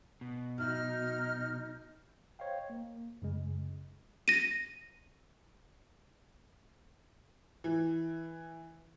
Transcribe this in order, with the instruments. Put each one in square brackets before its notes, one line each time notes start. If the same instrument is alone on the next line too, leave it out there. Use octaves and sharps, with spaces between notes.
[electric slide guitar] B2
[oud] F#3 E4 F#4 [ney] D#4 [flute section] F6
[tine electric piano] C5 C#5 D#5 F5 G5
A#3
F#2 C#3 G#3
[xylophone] A#6 D#7
[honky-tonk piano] E3